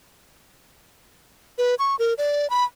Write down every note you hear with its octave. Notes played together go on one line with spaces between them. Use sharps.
B4
C#6
A#4
D5
B5